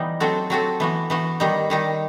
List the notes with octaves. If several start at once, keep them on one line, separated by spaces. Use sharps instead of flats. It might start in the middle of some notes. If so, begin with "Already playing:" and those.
Already playing: E3 G3 B3 D#4
F#3 C4 F#4 A4
F#3 C4 F#4 A4
E3 B3 F#4
E3 B3 F#4
D#3 G3 D#4
D#3 G3 D#4